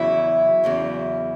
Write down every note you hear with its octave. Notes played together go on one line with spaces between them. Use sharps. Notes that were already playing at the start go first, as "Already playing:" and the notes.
Already playing: E2 C#3 F#3 E4 E5
E2 C#3 F#3